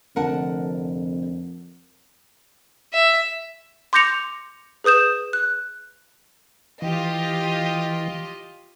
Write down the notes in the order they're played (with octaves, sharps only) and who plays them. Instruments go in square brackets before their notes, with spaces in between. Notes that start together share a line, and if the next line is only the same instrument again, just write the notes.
[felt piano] F1 D3 [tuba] F2 [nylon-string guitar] A#4 F#5 A5
[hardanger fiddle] E5
[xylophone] C6 D6 G6 A#6 C#7 F7
G#4 B4 D#6 G6 E7
F#6
[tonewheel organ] E3 [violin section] F4 G4 D#5